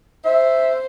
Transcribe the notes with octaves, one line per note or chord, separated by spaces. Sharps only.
C5 E5